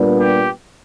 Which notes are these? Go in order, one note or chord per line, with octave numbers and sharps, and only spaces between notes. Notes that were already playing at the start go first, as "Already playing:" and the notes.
Already playing: A#2 G3 B3 D4
G4